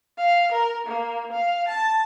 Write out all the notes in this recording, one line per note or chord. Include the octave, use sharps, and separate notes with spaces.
F5
A#4
A#3
F5
A5